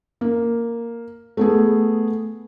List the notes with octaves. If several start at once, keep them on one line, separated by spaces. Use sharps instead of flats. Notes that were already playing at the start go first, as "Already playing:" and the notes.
A#3
A3 B3 G#4